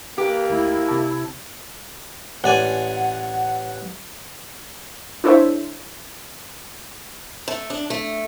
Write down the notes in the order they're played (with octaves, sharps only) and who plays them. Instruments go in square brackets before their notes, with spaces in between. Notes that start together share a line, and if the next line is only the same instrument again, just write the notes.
[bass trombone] A#3 [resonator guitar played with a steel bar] G4 [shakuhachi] B4
[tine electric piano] D2 [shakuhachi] E4
[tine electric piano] C3 A5
[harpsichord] A1 D5 G#5 [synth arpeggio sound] F#5
[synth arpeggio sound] D4 E4 A4 C5 C#5 E5
[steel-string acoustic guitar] A3
D4
A3